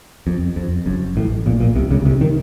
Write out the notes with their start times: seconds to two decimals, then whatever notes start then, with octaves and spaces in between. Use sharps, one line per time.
0.27 F2
0.56 F2
0.86 F#1 F#2
1.16 A1 A2
1.46 A#1 A#2
1.60 A#1 A#2
1.75 C2 C3
1.91 C#2 C#3
2.05 C2 C3
2.21 D#3